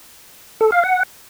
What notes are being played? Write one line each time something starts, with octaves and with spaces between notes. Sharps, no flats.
A4
F5
F#5